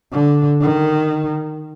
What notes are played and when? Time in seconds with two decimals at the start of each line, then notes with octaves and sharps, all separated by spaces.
0.13 D3
0.61 D#3